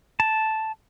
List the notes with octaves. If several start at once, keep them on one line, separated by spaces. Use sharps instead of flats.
A5